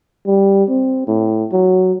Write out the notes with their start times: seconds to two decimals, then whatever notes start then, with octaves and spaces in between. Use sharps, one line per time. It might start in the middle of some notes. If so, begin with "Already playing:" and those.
0.26 G3
0.69 C4
1.08 A2
1.52 F#3